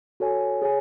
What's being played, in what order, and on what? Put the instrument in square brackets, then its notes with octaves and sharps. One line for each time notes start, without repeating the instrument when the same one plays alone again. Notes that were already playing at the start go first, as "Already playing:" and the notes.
[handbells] F#4 A4 C#5 G#5
G#4 C#5 G#5